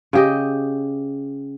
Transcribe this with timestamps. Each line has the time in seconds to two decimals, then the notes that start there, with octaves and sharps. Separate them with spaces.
0.13 C#3 G4 D#5